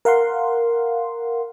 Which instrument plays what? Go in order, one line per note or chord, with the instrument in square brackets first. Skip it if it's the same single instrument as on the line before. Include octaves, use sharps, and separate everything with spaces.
[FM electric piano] A#4 F5 F#5 C6